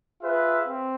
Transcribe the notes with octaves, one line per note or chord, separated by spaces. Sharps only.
F4 G#4 B4 E5
C4